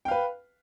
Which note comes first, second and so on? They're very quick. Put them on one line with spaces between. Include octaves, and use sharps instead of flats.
G5 F5 B4